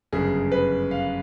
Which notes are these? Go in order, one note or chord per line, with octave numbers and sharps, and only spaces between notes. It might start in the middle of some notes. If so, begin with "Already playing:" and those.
G1 F#2 C#3 G#4
B4
F5